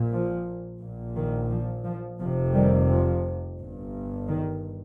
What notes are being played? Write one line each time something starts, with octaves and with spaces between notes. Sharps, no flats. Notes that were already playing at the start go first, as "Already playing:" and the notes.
Already playing: A#1 A#2
F3
A#1 A#2
D#3
F3
F3
F1 F2 C3 F3
D#3 G3
F3
G1 G2
D#3